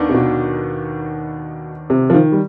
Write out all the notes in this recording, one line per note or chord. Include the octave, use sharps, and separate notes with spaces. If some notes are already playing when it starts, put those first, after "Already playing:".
Already playing: D#2 D#3 B3 D4
C3
B2
C3
F3
D#3
G3